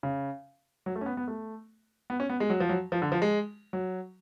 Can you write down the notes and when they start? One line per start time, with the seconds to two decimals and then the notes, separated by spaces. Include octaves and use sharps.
0.03 C#3
0.86 F#3
0.96 A3
1.01 C#4
1.06 B3
1.17 B3
1.28 A3
2.10 B3
2.20 C#4
2.30 B3
2.40 G#3
2.50 F#3
2.60 F3
2.69 F#3
2.92 F3
3.02 D3
3.12 F3
3.22 G#3
3.73 F#3